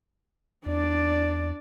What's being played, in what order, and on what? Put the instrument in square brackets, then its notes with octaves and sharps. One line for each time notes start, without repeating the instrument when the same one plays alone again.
[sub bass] E2 [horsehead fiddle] D4 D5